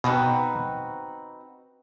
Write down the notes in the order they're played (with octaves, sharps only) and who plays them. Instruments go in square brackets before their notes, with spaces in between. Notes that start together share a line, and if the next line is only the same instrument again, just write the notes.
[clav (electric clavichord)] B2 [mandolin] C4 D#4 F#4 B4